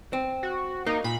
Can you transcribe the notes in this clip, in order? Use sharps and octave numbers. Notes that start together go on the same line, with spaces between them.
C4
F#4
A#3 D#4
A#2 B5